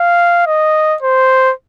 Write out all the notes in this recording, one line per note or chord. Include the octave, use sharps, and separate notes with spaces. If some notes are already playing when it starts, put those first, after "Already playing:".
Already playing: F5
D#5
C5